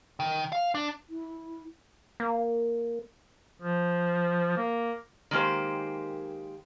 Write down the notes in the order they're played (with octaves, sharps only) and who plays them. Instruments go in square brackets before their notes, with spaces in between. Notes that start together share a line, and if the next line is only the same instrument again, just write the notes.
[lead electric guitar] D#3
F5
D4
[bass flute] E4
[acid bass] A#3
[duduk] F3
A#3
[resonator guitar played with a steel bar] D#3 G#3 A#3 G4 C5